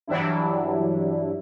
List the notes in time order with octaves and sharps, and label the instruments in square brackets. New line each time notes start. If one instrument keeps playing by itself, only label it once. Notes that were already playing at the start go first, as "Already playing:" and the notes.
[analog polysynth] G2 E3 F#3 G3 D4 E4